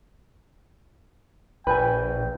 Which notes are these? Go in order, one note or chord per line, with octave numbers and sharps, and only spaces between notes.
A#1 B4 G5 G#5